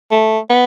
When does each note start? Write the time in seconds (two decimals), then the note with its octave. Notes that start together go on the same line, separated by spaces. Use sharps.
0.11 A3
0.50 B3